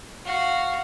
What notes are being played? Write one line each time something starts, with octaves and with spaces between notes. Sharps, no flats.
F#4 F5